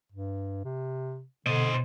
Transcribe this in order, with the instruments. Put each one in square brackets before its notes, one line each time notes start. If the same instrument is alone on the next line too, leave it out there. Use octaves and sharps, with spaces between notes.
[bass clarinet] G2
C3
[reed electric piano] B2 [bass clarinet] D3 [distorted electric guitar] C5 D#5